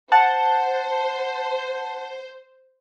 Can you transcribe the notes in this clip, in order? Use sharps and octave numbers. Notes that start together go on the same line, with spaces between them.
C5 F#5 A5